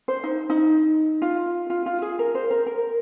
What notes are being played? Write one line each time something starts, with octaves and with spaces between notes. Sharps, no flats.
C5
D#4
D#4
F4
F4
F4
G#4
A#4
C5
A#4
A#4